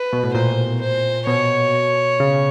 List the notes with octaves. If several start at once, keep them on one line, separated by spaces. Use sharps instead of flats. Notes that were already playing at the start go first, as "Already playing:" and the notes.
Already playing: B4
B2
A2
A#2 C5
C5
B2 C#5
C#3